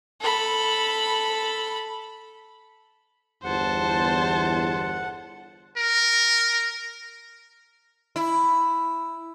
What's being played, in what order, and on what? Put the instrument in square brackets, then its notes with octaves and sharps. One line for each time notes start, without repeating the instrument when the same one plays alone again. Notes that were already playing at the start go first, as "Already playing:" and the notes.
[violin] A4 B5
[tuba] G1 [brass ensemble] E2 [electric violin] C5 A5 [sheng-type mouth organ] F#5
[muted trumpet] A#4
[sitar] E4